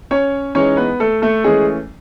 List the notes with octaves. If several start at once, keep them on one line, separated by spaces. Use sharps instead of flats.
C#4 C#5
E3 G#3 C#4 D#4 C#5
B3 B4
A3 A4
A3 A4
E3 G#3 A3 C#4 G#4